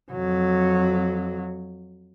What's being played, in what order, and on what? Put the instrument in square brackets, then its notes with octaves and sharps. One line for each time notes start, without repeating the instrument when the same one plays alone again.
[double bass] F2 F#3